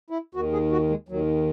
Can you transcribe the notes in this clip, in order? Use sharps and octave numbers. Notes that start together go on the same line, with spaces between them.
E4
D#2 D#3 F#4
G#4
F#4
G#3
D#2 D#3 F#3